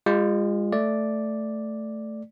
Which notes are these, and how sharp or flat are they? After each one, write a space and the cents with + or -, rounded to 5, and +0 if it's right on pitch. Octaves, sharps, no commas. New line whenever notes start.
G#3 -35 F4 +0
A3 +0 D5 +0